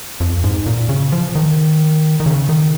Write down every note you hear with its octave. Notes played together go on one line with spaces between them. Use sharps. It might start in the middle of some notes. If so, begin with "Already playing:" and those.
F2
G#2
A#2
C#3
F3
D#3
D#3
C#3
D#3